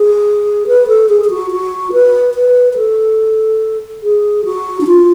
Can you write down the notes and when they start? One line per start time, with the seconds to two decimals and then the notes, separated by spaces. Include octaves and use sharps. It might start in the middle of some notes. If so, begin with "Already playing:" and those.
Already playing: G#4
0.67 B4
0.87 A4
1.09 G#4
1.24 G#4
1.30 F#4
1.51 F#4
1.93 B4
2.34 B4
2.73 B4
2.77 A4
4.03 G#4
4.45 F#4
4.81 D4
4.87 F4